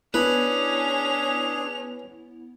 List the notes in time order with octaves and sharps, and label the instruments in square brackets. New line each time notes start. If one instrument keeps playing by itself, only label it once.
[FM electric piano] B3 E4 [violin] C#4 F7 [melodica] D4 G#4 [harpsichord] B4